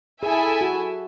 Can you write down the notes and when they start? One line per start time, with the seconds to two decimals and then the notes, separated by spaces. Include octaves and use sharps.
0.22 E4 G#4 A4 E5 G#5
0.61 F#4